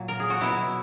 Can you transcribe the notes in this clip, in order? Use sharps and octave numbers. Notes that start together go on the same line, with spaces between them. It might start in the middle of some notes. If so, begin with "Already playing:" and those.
Already playing: A#2 F#3
A#4
G#4
F#4
B2 F#3 E4